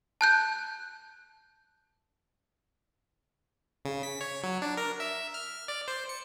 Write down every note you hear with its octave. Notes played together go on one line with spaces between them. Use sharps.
A5 F#6 G6
C#3
B6
C#5
F#3
D4
A#4
E5
F6
D5
C5
C#7